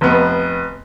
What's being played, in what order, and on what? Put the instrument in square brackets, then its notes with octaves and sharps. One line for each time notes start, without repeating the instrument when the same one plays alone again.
[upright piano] F1 B3